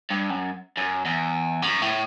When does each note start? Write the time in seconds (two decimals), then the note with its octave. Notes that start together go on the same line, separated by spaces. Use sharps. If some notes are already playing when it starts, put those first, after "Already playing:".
0.10 G2
0.30 F#2
0.77 F#2
1.06 E2
1.62 F#2
1.82 A2